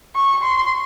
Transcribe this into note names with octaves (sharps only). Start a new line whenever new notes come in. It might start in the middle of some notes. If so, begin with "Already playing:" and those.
C#6
C6